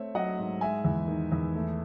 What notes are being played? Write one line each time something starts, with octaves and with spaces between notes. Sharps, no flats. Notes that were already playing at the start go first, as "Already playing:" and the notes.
Already playing: A3 C4 C#5 E5
F#3 D#5 F#5
G#2
G#3 E5 G#5
E2
D#3
E2
A3